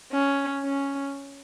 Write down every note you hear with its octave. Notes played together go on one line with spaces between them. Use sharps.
C#4
C#4